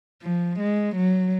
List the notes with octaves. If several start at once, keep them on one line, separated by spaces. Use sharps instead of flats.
F3
G#3
F#3